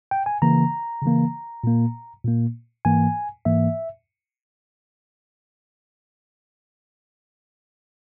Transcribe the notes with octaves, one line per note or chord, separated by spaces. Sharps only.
G5
G#5
C#3 E3 A#3 A#5
C#3 E3 A#3
A#2 A#3
A#2 A#3
G#2 E3 A#3 G#5
G#2 E3 A#3 E5